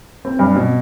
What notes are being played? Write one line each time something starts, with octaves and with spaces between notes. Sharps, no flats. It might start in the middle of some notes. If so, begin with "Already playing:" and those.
C4
G2
B2